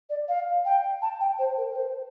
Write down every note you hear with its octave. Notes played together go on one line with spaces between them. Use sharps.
D5
F5
G5
A5
G5
C5
A#4
A#4
C5